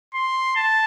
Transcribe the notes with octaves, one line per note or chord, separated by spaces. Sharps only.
C6
A5